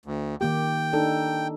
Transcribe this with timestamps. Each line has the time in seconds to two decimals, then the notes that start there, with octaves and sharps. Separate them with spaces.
0.06 D2
0.41 D#3 A#3 G4 G5
0.93 D4 D#4 A4